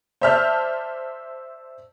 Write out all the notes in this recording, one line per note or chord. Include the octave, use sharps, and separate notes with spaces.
C5 D5 E5 A5 F6 G6